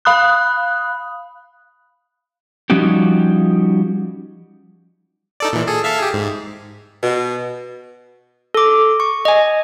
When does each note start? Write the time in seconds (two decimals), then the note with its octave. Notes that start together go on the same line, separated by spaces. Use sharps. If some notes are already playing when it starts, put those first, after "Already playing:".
0.05 F5 B5 D#6 F#6
2.70 F3 G3 C#4 D#4 F#4 G4
5.40 D#4 A4 D5
5.53 A#2 E3
5.68 G#4 A4
5.84 A4 E5 F5
6.00 G4 G#4
6.14 G#2
7.03 B2
8.54 A4 D6
9.00 C#6
9.25 D#5 G#5